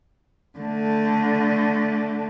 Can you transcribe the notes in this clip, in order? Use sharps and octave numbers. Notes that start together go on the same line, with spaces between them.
D3 A3